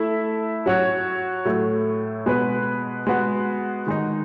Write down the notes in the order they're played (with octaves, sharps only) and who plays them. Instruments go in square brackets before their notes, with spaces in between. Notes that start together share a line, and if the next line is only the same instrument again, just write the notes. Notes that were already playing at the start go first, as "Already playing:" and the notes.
Already playing: [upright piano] A3 E4 A4 E5
F#3 C#4 F#4 C#5
A2 F#3 A3
B2 G#3 B3 F#4 B4
G#3 B3 F#4
D#3 G#3 D#4